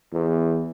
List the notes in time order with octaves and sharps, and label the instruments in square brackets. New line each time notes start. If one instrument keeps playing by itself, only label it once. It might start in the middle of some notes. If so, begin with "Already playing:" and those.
[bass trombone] E2